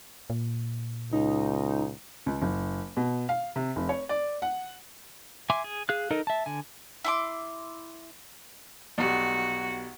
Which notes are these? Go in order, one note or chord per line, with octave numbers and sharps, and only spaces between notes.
A#2
C#2 D#4
C#2
F#1
B2
F5
C3
F1
C#5
D5
F#5
E5 G#5 C6 D6
G#4
G#4 F5 F#6
D#4 A4 A#4 D#5
E5 A5
D3 G#5
E4 C6 D6
B1 G3 F#4